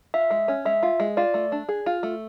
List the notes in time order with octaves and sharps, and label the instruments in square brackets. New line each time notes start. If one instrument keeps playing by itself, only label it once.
[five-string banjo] F4 [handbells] E5
[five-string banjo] G#3
C#4
[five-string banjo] G#3 [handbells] E5
[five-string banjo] F4
G#3
[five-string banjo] F4 [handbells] D5
[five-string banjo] A3
D4
G#4
F4
A3